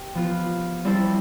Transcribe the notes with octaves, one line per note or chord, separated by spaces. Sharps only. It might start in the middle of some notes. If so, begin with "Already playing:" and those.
Already playing: G4
F3 B3 F4
G3 C4 E4 A4 C5